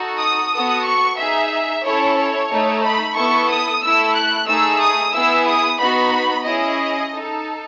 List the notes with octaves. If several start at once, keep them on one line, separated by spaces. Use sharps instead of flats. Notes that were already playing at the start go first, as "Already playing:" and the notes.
Already playing: D#4 F#4 A4
D#6
B3 F#4 A4
C#6
D#4 G#4 E5
C#4 E4 A4 C#5
C#5
A3 D#4 A4
B5
B3 E4 A4 C#6
D#6
A3 E4 A4 E6
F#6
A3 D#4 G#4 E6
D#6
B3 E4 G#4 E6
D#6
B3 D#4 F#4 B5
C#4 E4 G#4 D#5
D#4 A4